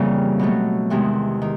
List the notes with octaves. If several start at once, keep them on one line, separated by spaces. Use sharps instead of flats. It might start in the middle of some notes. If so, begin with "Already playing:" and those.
Already playing: F2 C#3 E3 G3 A#3
B2 F#3 A3
E2 C3 D#3 G#3
D#3